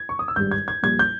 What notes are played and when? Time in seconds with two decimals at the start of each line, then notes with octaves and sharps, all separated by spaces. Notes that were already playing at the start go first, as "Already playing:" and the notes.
Already playing: G#6
0.09 C#6
0.19 D#6
0.28 E6
0.36 G#1 G2 G3 G6
0.51 G#6
0.68 G#6
0.83 A#1 A#2 G3 G#6
0.99 G6